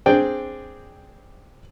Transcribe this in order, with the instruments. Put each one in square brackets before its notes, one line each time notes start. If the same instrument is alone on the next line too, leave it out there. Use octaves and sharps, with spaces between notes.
[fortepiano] C4 D4 G#4 D5 G5